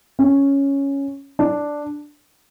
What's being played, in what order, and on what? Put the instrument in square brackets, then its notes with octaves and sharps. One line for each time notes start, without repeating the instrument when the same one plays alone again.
[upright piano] C#4
D4